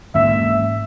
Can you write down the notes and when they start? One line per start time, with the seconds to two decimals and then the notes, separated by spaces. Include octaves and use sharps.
0.15 G#2 E3 A#3 C#4 E5